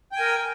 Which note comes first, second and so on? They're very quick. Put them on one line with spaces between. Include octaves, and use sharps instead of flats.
G5 G#5 A#4